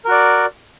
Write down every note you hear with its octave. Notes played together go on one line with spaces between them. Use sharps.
F#4 A#4 D5